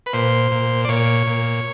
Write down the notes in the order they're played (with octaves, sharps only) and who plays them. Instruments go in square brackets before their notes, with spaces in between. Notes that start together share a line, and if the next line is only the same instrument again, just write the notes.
[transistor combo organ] B4
A#2 C5
A#2
D5
A#2 C#5
A#2